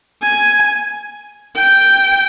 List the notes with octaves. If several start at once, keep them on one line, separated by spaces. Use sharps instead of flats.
G#5
G5